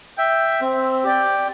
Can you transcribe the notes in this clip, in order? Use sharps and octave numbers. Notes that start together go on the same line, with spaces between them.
E5 G5
C4
G4 D5 G5